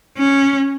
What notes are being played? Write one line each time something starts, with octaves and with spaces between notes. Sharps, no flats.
C#4